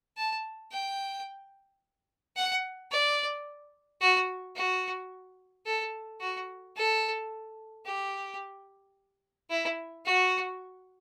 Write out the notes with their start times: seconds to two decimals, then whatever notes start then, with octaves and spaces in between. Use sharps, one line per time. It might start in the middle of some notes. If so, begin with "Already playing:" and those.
0.17 A5
0.72 G5
2.36 F#5
2.92 D5
4.01 F#4
4.56 F#4
5.66 A4
6.21 F#4
6.77 A4
7.86 G4
9.50 E4
10.06 F#4